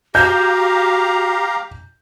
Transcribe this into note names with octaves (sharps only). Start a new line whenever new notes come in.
F#4 G4 F5 A#5 G6